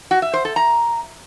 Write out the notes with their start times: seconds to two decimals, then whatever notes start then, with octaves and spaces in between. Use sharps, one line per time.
0.11 F#4
0.22 E5
0.34 C5
0.45 A4
0.56 A#5